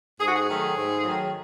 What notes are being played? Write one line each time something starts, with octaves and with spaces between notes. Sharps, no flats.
G#2 G#4
F#4
G#4
D#3 F#3 A3
G#2
D#3 F#3 A3